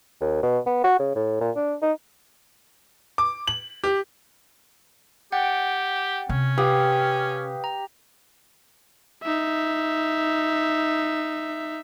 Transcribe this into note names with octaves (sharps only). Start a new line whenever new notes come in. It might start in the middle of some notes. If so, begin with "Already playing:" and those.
D#2
B2
B3
F#4
C#3
A2
A#2
D4
D#4
D6
F#7
G4
G4 F#5 G5 A6
C3 C#4
G4 B4 F5 D#6
A#5
D#4 E5